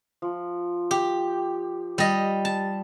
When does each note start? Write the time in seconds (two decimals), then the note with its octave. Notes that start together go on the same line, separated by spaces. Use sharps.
0.22 F3
0.91 G4
1.98 G3 D#5
2.45 A5